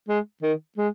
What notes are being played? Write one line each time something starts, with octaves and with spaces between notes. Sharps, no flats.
G#3
D#3
G#3